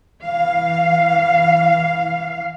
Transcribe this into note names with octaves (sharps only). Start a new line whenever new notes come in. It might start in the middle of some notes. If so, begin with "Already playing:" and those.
E3 F5